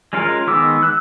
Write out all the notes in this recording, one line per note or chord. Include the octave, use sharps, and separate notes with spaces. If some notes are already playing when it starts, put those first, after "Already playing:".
G#3 C#4 F4 A#4 F5
D#3 G#3 B3 D6 E6
E6 F#6